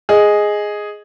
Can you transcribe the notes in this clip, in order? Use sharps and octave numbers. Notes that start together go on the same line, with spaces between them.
G#4 D#5